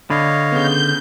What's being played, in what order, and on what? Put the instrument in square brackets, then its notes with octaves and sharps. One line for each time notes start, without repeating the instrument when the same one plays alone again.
[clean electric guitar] D3 [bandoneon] C#5 D#5 F5 [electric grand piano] B5
[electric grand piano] C#3 B3 [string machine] G6